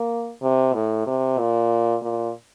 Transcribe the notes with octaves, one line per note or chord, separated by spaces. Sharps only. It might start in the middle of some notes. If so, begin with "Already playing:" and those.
Already playing: A#3
C3
A2
C3
A#2
A#2